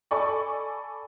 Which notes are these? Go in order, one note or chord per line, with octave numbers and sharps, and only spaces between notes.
A4 D5 G#5 B5 C#6